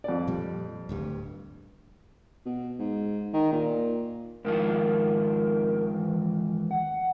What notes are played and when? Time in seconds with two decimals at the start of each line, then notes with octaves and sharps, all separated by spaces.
0.04 F2 D5
0.27 A#2 F3 G3
0.89 D1 D2 G2
2.46 B2
2.79 G#2
3.33 D#3
3.52 A#2
4.45 G#2 D#3 F3 A#4
5.94 E3
6.71 F#5